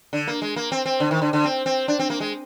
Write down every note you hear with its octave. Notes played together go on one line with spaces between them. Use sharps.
D3
A#3
G#3
A#3
C4
C4
D3
D#3
D3
D3
C4
C4
D4
C4
A#3
G#3